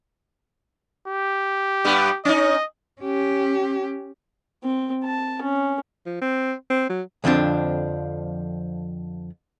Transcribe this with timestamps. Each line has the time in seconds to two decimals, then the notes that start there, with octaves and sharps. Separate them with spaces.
1.08 G4
1.84 G2 G3 B3
2.25 C#4 D#4 D#5
3.01 C#4 G4
4.64 C4
5.04 A5
5.42 C#4
6.06 F3
6.21 C4
6.70 C4
6.90 F#3
7.24 F2 D3 F3 C4 D4